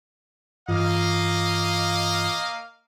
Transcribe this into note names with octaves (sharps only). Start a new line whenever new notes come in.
G2 E3 A#3 F4 D#5 F5